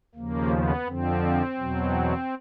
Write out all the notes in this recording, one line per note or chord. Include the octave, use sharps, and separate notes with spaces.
D#2 C#3 F3 A#3
B3
F2 D3 F3 C4
E2 B2 F#3